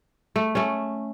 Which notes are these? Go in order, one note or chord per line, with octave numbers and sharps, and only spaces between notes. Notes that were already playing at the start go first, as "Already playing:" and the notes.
A3
A3 C#4